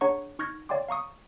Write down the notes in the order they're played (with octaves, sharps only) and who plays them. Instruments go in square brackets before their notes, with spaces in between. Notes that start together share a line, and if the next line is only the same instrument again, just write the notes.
[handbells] D4 G#4 C#5 F#5 A#5 C#6
D#4 C#6 F6 G6 G#6 A#6
C#5 D5 F5 G5 C6 D6
F5 A#5 C#6 D#6